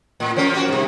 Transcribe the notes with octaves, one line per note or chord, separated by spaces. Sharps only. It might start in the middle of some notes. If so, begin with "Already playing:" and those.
A2
F3 C#4 A#4
A#3 F#4
G2 C3